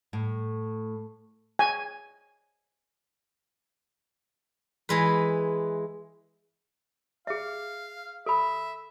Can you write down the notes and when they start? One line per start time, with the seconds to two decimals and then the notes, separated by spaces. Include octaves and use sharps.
0.13 A2
1.59 G#5
4.89 E3 G#3 B4
7.27 G#4 E5 F5
8.26 A4 E5 B5